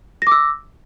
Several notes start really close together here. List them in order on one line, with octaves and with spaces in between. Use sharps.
A#6 D6 E6